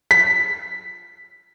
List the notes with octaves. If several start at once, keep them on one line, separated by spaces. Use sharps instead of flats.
B6